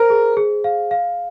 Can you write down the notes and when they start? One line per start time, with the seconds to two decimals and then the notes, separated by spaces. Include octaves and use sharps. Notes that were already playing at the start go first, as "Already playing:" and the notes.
Already playing: A#4 C5
0.10 G#4
0.37 G#4
0.64 F5
0.91 F5